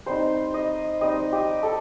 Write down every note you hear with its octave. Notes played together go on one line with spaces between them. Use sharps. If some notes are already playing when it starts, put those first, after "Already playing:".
G3 C4 D#4 C5
D#5
G3 C4 D#4 D#5
G4
A4